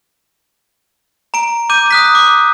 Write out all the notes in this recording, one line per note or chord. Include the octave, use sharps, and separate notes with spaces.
A#5 D7
D6 G6 D#7
D#6 F#6 B6
D6